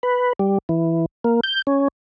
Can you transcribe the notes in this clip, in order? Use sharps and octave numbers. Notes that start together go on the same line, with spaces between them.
B4
G3
E3
A#3
G6
C#4